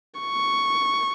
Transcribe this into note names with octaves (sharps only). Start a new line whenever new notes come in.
C#6